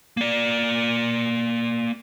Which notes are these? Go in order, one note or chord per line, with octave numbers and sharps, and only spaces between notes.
A#3 D5